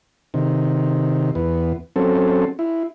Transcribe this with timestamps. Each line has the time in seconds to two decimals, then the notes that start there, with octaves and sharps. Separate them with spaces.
0.34 C3 D#3
1.35 E2 B3
1.96 F#3 C4 C#4 A4
2.59 E4